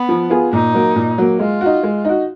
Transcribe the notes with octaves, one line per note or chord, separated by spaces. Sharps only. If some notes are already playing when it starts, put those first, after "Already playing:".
Already playing: B3
F3
B3 F4 G#4
A#2 D#4
F#3 A#3
A#2
F#3 A#3
G#3 F4
D#4 F#4
G#3
D#4 F#4